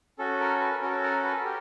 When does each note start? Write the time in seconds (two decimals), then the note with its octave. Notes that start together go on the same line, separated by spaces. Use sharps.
0.19 C#4 F#4 A4
0.40 A#4
0.60 B4
0.81 C#4 F#4 A4 A#4
1.03 A#4
1.24 B4
1.45 G4 A#4